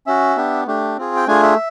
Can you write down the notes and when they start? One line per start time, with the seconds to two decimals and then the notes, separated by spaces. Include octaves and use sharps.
0.07 C#4 F#4 E5
0.37 B3 D4 G4
0.67 A3 D4 G4
0.97 C4 F4 G#4
1.16 G5
1.27 A3 D4 F4 G#4 G#5
1.43 E5